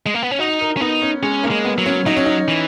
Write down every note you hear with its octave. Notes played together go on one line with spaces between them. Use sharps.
G#3
A#3
B3
C#4
D#4 F#4
A#4
C#4
B3 D#4
C#4
G#3 C#4
A#3
G#3
B3
F#3
C#4
F#3 D#4
C#4
D#4
E3